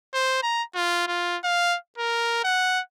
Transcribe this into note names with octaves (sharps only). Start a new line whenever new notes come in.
C5
A#5
F4
F4
F5
A#4
F#5